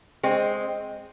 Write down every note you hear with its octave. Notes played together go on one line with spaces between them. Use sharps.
G#3 C4